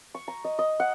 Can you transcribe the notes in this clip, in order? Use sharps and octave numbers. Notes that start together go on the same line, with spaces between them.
C#6
A#5
D#5
D#5
F#5